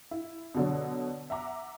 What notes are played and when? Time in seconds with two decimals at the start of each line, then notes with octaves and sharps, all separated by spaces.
0.11 E4
0.55 B2 D3 F#3
1.30 E5 F#5 A#5 D6